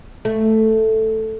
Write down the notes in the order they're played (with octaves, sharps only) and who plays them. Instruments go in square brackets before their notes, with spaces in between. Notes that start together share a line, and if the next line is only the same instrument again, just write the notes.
[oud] A3